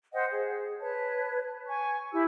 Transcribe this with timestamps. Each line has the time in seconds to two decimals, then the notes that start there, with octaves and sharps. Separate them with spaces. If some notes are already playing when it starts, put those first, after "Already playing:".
0.13 C5 D#5 F#5 G5
0.32 G#4
0.80 B4 C#5 A5
1.68 G#5 C#6
2.12 E4 G4 E6